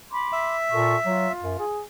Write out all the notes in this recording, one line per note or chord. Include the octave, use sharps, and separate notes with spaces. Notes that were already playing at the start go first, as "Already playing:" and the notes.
B5 C6 D6
E5
A#2 A4 A#4 C#6
F#3 F4
F#2
G#4